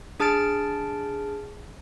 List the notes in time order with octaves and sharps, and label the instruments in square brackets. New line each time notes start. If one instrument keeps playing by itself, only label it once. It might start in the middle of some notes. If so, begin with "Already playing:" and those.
[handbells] D4 G#4 A5 F6 A6 D7